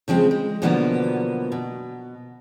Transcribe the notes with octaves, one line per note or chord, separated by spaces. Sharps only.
C#3 F3 G#3 C4
G#3
B2 D3 F3 F#3 A#3 B3
B2